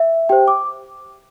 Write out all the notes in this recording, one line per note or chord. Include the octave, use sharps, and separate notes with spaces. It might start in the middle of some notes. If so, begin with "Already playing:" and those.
Already playing: E5
G4 C5 G5
D6